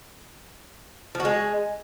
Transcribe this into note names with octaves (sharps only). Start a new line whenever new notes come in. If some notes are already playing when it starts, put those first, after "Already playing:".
F3
F#4
G#3